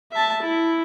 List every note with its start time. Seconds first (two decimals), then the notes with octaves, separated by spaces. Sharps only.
0.12 E5 A5
0.42 E4